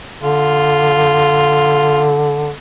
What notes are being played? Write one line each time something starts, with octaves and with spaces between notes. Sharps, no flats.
D3 F4